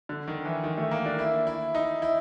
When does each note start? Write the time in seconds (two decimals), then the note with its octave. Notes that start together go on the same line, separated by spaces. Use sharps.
0.09 D3
0.28 D#3
0.45 E3
0.64 D#3
0.78 A3
0.91 A#3
1.06 D4
1.19 E4
1.47 E4
1.75 D#4
2.02 E4